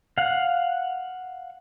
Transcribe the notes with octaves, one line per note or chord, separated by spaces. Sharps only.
F5 F#5